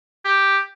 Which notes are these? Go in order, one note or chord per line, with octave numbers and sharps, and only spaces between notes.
G4